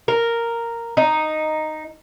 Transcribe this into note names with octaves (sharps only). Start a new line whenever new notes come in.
A#4
D#4